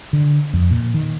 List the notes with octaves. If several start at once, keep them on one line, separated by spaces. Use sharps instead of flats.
D3
F2
A#2
D#3